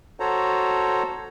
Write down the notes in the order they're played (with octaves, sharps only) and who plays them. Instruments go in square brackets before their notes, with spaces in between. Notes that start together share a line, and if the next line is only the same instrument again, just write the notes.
[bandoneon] F#4 A4 C5 C#5 A#5